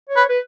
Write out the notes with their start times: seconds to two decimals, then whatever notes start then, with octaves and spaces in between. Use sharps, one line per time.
0.10 C#5
0.16 B4
0.29 B4